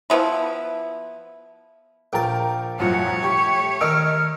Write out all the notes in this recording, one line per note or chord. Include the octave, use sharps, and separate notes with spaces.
F3 B3 E4
A#1 A#4 G5 A5
C2 F#2 F3 A3 C#5 F#5
G4 C#6
D#3 D#5 E6 F6 D7